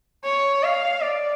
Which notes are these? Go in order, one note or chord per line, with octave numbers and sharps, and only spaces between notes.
C#5
F5
D5